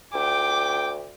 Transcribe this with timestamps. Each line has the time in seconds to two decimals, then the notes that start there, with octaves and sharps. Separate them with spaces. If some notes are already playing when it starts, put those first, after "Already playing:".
0.14 D2 G5 D6